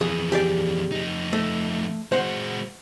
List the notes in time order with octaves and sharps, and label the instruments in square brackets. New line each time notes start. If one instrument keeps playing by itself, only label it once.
[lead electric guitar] F2 E3 [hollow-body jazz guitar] G#4
[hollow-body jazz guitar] G4 G#4 D5
[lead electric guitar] F2 D#4
[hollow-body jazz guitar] A3
[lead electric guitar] G#3 F#4 [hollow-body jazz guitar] C5 F#5